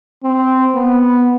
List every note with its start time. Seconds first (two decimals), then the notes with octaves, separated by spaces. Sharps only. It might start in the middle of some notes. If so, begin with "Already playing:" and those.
0.23 C4
0.75 B3